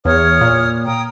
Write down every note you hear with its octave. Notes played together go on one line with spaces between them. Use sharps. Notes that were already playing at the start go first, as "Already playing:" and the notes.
E2 C#5 D#6 F6
A#2
G5 A#5 D#6